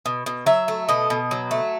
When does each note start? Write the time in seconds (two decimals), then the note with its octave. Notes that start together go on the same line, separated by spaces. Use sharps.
0.06 B2
0.26 B2
0.46 F#3 E5
0.68 A3
0.89 B2 D#5
1.10 B2
1.31 F#3
1.51 A3